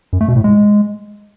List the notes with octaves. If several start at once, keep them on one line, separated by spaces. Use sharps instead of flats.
F#2
A3
B2
A2
G#3